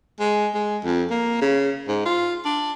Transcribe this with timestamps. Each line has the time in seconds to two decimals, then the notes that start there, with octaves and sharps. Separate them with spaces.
0.20 G#3
0.54 G#3
0.84 F2
1.10 A#3
1.41 C#3
1.88 G#2
2.05 F4
2.45 D4